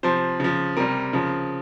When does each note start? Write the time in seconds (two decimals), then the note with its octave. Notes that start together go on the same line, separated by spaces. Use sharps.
0.03 C3 F3 C5
0.40 C#3 F3
0.77 C3 G3 A#4
1.13 C#3 F3